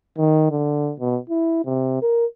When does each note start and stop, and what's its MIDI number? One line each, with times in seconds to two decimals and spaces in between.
0.18 0.49 51
0.51 0.92 50
1.00 1.18 47
1.30 1.60 64
1.65 2.01 48
2.02 2.26 70